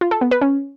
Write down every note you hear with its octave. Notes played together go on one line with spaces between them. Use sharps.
F4
A4
B3
B4
C#4